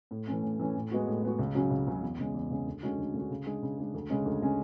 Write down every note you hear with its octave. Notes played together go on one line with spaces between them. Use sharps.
A2
E3 A3 C#4
A2
E3 A3 C#4
A2
G#3 B3 F#4
A2
G#3 B3 F#4
C#2
C#3 F#3 C#4 F#4
C#2
C#3 F#3 C#4 F#4
E2
C#3 G#3 C#4
E2
C#3 G#3 C#4
D2
D3 G#3 C#4 F#4
D2
D3 G#3 C#4 F#4
C#3
G#3 D4 G#4
C#3
G#3 D4 G#4
D2
C#3 G#3 C#4
D2
C#3 G#3 C#4